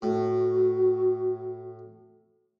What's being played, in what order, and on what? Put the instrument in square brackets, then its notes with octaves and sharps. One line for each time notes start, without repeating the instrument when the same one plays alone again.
[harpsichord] A2 [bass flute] F#4